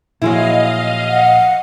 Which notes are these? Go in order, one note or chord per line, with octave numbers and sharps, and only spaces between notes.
A#2 F3 F#3 G#3 E4 D#5 F5
F#5